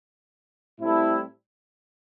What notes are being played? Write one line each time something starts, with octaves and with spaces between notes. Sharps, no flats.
A2 G3 C4 E4 A4